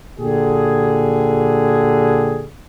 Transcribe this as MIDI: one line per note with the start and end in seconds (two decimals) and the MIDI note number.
0.19 2.47 46
0.19 2.47 50
0.19 2.47 67
0.19 2.47 68